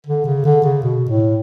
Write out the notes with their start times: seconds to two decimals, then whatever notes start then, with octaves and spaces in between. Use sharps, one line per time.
0.06 D3
0.25 C#3
0.45 D3
0.64 C#3
0.83 B2
1.09 A2